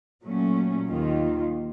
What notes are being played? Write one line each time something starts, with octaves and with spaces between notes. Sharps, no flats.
A#2 F#3 A3 C#4
D#2 D#3 A#3 F4